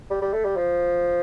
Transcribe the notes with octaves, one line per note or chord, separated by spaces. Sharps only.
G3
G3
A3
G3
F3